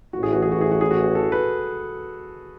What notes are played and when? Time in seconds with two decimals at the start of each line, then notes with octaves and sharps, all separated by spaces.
0.13 A1 A2 E3 F#4
0.23 G#4
0.32 F#4
0.42 G#4
0.52 F#4
0.61 G#4
0.71 F#4
0.81 G#4
0.91 F#4
1.15 A4
1.32 B4